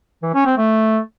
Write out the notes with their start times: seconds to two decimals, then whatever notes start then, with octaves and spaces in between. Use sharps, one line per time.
0.23 E3
0.34 C#4
0.46 C4
0.58 A3